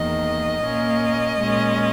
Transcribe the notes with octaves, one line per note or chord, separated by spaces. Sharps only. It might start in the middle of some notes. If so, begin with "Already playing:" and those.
Already playing: E2 D#3 A#3 D#5
A#2 A#3 C#4
A#2 G#3 C#4